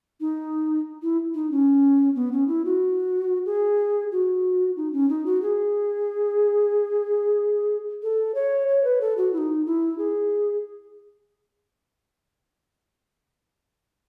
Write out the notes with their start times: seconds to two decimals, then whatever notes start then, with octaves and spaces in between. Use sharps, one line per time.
0.20 D#4
1.02 E4
1.34 D#4
1.51 C#4
2.15 B3
2.32 C#4
2.48 E4
2.65 F#4
3.46 G#4
4.12 F#4
4.76 D#4
4.93 C#4
5.09 D#4
5.26 F#4
5.42 G#4
8.03 A4
8.35 C#5
8.68 C#5
8.84 B4
9.01 A4
9.17 F#4
9.33 E4
9.38 D#4
9.66 E4
9.98 G#4